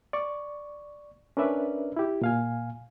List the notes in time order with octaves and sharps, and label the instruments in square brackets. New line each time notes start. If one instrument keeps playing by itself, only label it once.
[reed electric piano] D5 C#6
C#4 D4 A#4 B4 D5 E5
E4 G4
A#2 F5 G#5